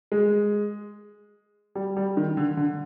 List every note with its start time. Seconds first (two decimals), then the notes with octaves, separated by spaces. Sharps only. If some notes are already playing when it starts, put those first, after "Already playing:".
0.12 G#3
1.75 G3
1.97 G3
2.17 D#3
2.37 D3
2.57 D3